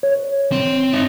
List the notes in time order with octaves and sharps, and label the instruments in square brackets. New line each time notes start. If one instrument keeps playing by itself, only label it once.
[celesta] C#5
[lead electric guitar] C4
D#4